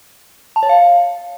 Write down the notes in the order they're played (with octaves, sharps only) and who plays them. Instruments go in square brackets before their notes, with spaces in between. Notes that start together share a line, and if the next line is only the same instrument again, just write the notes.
[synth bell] A5
C#5
F5